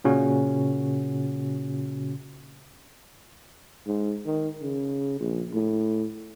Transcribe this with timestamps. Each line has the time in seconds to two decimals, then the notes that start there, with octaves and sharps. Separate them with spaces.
0.04 A#2 C#3 C#4 F#4
3.87 G#2
4.26 D#3
4.61 C#3
5.20 A#1
5.53 A2